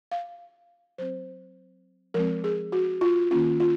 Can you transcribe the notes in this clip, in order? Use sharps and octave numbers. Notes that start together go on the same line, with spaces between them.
F5
F#3 C4 C5
F3 G#3 C4 A#4
G#4
F#4
F4
D#3 A#3 C#4 F4
F4